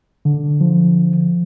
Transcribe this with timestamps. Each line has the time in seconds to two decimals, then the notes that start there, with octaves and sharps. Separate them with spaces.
0.25 D3
0.61 F3